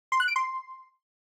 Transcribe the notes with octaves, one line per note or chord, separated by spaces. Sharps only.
C6
F#6
D7
C6